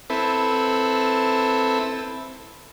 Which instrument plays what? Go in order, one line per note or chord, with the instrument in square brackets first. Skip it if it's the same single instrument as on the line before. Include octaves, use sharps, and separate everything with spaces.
[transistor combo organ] C4 E4 A4 B4